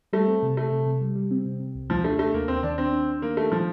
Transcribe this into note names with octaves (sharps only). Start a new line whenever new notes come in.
G3 A3
C4
C3
C3 A3
C3
C3
G3
G3
C4
C3
C3
C2
D#2 F3
A3 D4
A3 D4
D#2 A#3
D#2 C4
D#3 D4
C4 D4
D4
D4
D#3 A#3
D#3 A3
D#3 F3